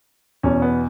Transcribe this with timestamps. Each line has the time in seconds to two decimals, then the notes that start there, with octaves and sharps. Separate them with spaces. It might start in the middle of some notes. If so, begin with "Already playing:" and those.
0.43 E2 B2 C#4
0.62 B3